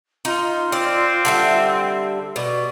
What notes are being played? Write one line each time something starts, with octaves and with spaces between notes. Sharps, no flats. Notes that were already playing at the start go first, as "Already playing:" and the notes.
D#4 F4
C4 D5
D3 G3 E5
B2 D5